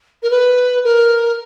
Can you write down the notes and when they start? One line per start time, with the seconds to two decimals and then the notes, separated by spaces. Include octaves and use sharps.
0.22 A#4
0.30 B4
0.84 A#4